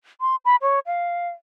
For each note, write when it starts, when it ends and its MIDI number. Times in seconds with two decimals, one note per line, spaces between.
0.21 0.36 84
0.45 0.56 83
0.62 0.80 73
0.86 1.28 77